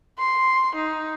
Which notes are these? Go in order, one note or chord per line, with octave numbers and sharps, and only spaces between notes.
C6
D#4